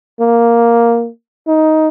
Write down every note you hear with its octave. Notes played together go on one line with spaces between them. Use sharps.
A#3
D#4